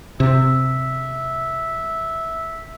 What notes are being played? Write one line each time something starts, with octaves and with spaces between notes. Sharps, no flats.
C3 E5